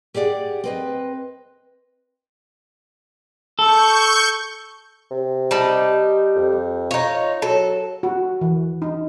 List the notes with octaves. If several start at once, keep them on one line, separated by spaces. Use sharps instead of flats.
G4 G#4 D5 F5 F#5
C4 B4 D#5
A4 C#6 G6
C3
G3 D#4 A5
F2
D#4 F4 C#5
F#3 A4
F#4
E3
D#4